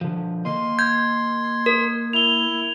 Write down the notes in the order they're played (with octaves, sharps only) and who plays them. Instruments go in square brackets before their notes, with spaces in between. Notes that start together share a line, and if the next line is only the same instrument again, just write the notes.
[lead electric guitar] D3 F3
[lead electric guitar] A#3 D#5 [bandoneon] C6
[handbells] G6 [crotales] G#6
[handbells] A#4
[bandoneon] E4 [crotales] F7 G7